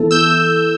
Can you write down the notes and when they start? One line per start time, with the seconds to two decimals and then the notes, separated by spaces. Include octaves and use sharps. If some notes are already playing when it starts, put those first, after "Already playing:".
Already playing: E3 B3 E4 A4
0.11 E6 G6